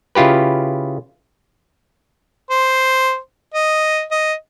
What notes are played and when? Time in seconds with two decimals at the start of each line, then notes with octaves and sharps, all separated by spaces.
0.15 C#3 E4 F4 G4 B4
2.50 C5
3.54 D#5
4.11 D#5